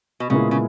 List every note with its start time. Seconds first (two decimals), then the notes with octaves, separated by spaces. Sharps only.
0.20 B2
0.30 A#2 C#3 G#3 B3 E4 A#4
0.51 C#3